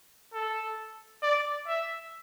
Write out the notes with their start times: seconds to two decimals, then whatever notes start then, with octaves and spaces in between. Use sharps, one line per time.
0.34 A4
1.23 D5
1.67 E5